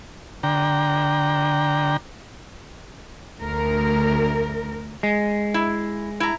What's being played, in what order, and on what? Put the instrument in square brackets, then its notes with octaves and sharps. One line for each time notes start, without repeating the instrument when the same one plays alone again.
[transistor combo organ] D3 G5 A#5
[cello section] D2 A#4
[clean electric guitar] G#3
[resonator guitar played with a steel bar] E4
E4 A#5